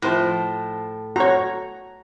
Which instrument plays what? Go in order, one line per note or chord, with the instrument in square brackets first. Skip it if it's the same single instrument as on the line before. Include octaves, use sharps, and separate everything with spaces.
[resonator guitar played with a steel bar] A2 [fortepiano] F3 C5 F#6
[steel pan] F#4 C#5 [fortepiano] A#5